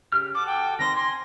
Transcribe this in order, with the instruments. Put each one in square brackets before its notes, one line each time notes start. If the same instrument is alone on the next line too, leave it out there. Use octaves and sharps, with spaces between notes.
[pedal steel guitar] C#3 G4 F6
[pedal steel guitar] F#4 A4 [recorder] D6
[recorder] G5
[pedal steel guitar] D#3 C4 C6 [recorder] A#6
[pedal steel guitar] G#5 [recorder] C6